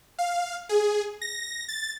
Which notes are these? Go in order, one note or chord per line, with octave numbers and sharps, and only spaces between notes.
F5
G#4
A#6
A6